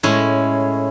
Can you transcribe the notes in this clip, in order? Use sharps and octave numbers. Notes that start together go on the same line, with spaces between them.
A2 G#3 C#4 E4